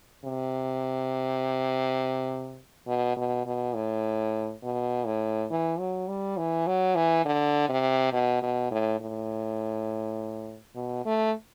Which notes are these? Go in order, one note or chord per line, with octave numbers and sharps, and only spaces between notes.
C3
B2
B2
B2
A2
B2
A2
E3
F#3
G3
E3
F#3
E3
D3
C3
B2
B2
A2
A2
B2
A3